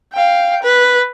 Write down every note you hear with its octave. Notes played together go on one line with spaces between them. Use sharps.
F5 G5
B4